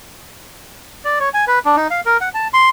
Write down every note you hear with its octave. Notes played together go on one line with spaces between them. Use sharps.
D5
C#5
G#5
B4
D4
D#4
F5
A#4
F#5
A5
C6